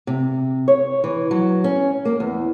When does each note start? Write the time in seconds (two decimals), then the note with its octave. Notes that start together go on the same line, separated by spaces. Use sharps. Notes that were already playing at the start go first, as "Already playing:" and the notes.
0.07 C3
0.68 C#5
1.04 E3
1.31 F#3
1.64 C#4
2.05 A#3
2.20 E2